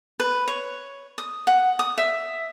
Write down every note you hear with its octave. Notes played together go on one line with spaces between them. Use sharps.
B4
C#5
D#6
F#5
D#6
E5